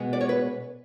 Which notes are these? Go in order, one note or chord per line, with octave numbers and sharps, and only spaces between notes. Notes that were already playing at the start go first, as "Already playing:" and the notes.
Already playing: B2 G#3 B3
D5
C#5
B4